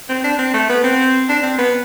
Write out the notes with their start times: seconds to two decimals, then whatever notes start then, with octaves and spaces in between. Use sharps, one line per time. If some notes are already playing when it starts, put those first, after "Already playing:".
0.09 C4
0.24 D4
0.39 C4
0.54 A3
0.70 B3
0.84 C4
1.29 D4
1.43 C4
1.58 B3